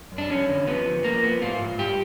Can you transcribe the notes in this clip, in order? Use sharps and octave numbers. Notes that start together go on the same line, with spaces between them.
F#2
D4
F2 C#4
D3
F3 B3
F3
F3 A#3
F3 B3
G#2 F4
G#2
G2 G4